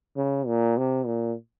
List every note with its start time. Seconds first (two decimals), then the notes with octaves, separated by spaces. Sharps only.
0.17 C#3
0.47 A#2
0.77 C3
1.06 A#2